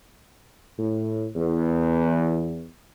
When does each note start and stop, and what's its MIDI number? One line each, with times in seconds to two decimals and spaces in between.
0.78 1.29 45
1.36 2.66 40